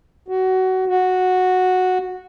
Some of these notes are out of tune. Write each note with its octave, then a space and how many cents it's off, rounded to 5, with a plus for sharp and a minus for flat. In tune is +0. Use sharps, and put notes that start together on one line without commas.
F#4 +20
F#4 -5